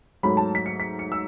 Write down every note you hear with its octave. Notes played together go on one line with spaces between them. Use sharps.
G#2 F#3 A3 B5
A5
B6
C#7
B6
C#7
E6